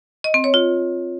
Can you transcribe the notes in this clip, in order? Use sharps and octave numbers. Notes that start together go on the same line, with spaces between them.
D#5
C4
C#5
F4